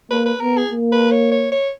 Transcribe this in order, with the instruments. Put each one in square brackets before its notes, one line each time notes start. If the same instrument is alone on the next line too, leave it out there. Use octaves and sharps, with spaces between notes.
[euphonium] A#3 [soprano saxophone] B4
[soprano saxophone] B4
[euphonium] B3 [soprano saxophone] A#4
[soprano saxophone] G#4
[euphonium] A#3
[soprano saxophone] B4
C#5
C#5
C#5